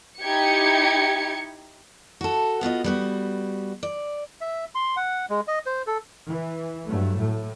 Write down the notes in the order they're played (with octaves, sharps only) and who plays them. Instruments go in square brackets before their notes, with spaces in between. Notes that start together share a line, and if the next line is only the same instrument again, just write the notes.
[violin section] D#4 E4 G4 G#6 C#7
[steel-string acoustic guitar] F#4 A4
B3 F4 F#4 D#5
G3 B3 F#4
D5
[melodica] E5
C6
F#5
G#3
D#5
C5
A4
[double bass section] E3
G2 F#3 A3
A2